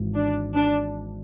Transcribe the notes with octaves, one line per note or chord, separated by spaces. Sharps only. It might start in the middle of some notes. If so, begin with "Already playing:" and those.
Already playing: G#1 G#2 E3
D4
D4